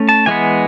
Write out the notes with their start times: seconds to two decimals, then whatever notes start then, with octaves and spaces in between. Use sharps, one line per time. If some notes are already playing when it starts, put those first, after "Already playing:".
Already playing: A3 C#4
0.09 A5
0.26 E3 G#3 B3 G#5